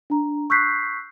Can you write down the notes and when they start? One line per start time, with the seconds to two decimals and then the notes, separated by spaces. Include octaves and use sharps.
0.10 D4 A#5
0.50 C#6 E6 F#6 G6 B6 C7